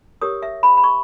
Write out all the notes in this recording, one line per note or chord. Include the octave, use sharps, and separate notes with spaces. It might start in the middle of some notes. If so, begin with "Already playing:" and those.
G4 A#4 C#5 D#6
E5
B5
B5
C#6